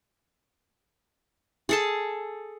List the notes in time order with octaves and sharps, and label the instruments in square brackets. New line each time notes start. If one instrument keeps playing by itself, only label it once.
[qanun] G#4 A4 A5